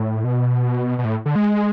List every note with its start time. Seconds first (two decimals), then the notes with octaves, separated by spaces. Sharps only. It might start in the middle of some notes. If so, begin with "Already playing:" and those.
Already playing: A2
0.24 B2
0.99 B2
1.05 A2
1.26 D3
1.35 G#3